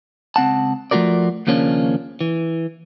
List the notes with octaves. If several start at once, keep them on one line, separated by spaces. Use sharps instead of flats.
C#2 C4 F#5 A5
F3 A3 F4 F#4 A#4 D5
D#2 C#3 F3 A#3 C#4 D4
E3